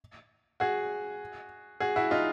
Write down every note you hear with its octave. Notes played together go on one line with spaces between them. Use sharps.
F#4 G#4
F#4 G#4
E4 F#4
D#4 F4